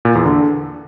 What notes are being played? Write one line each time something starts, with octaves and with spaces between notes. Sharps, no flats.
A#2
E2
D3